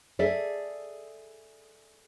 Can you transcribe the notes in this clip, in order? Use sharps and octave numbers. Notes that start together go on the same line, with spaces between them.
G#4 A4 D5 E5